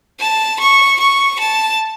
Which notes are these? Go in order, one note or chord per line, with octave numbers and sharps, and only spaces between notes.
A5
C#6
C#6
A5